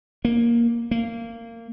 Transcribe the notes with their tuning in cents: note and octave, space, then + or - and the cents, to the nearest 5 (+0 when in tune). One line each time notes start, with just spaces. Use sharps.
A#3 +10
A#3 -25